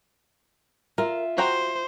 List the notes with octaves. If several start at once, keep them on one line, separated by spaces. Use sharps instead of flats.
F4 A#4 E5
F#4 C5 G5 A#5